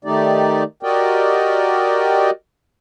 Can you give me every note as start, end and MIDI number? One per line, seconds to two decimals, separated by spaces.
0.05 0.63 51
0.05 0.63 57
0.05 0.63 63
0.05 0.63 67
0.05 0.63 74
0.83 2.30 66
0.83 2.30 67
0.83 2.30 70
0.83 2.30 74
0.83 2.30 75
0.83 2.30 79